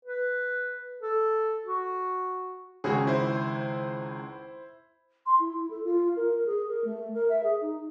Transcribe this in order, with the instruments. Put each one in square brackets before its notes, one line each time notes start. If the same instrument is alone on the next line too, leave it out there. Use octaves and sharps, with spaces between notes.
[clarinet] B4
A4
F#4
[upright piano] G#1 C#2 [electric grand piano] C#4 F#4 G#4
[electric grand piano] E4 C5
[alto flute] C6
E4
A4
F4
A#4
G#4
A#4
A3
A#4
E5
G#4
D#4